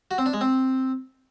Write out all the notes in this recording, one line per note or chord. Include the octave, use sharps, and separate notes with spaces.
F#4
C4
D4
G#3
C4